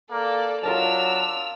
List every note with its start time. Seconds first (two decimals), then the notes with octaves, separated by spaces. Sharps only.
0.11 A#3 A4 D5
0.63 F#3 D4 F4 A#4 A5 E6 F7